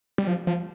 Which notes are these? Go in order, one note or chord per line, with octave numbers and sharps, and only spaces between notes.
G3
F3
F3